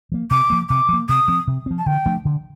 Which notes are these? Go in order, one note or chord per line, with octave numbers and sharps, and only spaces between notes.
F3 A#3
C3 D6
F3 A#3
C3 D6
F3 A#3
C3 D#6
F3 C4
C3
F3 C4
A5
D3 G5
F3 A3 D4
D3